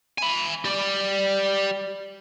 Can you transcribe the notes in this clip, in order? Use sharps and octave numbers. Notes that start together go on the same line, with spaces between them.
G#5 B5
G4 D5